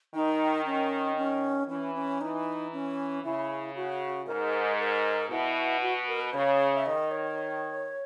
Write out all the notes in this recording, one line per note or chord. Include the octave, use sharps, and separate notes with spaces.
D#3 D#4
C#4
C#4
E3 C#4
C#4
E3 D#4
C#4
C#3 E4
F#4
G#2 A#4
A#4
B2 E4
F#4
A#4
B4
C#3 C#5
E5
D#3 D#5
C#5